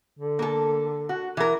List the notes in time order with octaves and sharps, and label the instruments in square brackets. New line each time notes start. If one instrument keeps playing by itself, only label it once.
[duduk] D3
[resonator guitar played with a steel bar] A#3 A4
F#4
E3 A#4